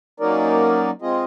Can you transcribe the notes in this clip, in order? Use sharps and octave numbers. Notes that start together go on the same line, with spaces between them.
F#3 A#3 C#4 D#4 A#4 D5
G#3 C4 F4 G#4 D#5